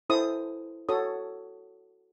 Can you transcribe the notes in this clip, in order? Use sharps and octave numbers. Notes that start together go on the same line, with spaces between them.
E4 A4 C5 D#6
F#4 A4 C#5 D#6